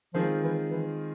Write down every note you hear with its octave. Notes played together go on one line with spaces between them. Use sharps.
D#3 F3 G#3 C4 F4 G#4
E3
E3